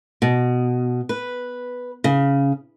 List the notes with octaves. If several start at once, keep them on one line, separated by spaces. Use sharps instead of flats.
B2
B4
C#3